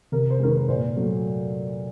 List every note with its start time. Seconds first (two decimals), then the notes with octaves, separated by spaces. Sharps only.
0.12 C3 A#4
0.31 C5
0.40 D#3 G#3 A#4
0.50 B4
0.69 A#2 C5
0.96 F#3 A3